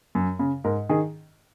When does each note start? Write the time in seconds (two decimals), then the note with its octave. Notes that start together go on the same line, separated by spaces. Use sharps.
0.15 F#2
0.39 C#3
0.64 G#2 A#4
0.89 D#3 G#4